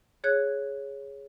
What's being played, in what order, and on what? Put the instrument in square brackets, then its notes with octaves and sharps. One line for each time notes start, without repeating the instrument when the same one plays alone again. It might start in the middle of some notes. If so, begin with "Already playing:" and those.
[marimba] G#4 C#5 F#6 G#6